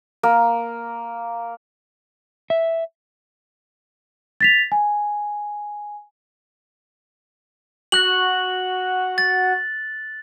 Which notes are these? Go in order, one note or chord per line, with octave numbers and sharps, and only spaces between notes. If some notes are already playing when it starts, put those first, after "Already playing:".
A#3
E5
A6 B6 F7
G#5
F#4 F#6 F#7
A6